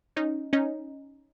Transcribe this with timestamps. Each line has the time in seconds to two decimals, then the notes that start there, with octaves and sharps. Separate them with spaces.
0.16 C#4 D#4
0.53 C#4 D#4